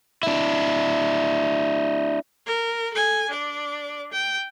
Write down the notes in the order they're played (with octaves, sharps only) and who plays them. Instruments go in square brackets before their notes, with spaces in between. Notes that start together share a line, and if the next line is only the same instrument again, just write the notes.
[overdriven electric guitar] D4 E4
[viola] A#4
A4 G#5
D4 D5
G5